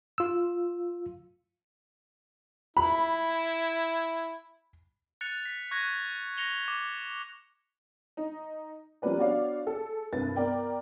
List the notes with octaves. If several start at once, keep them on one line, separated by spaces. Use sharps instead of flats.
F4 E6
E4 B5
F#6 A6 C#7 F7
B6
C#6 F#6 G#6 A#6
A#6 C#7 F7 G7
D6
D#4
F3 G3 A#3 C#4 B4 D5
B3 D4 F#4 C#5 D5 F5
G#4 A4
C2 G2 C3 B4 A6
B3 A#4 D5 G5